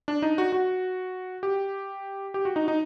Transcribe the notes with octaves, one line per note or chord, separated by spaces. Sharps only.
D4
D#4
F#4
F#4
G4
G4
F#4
D#4
D#4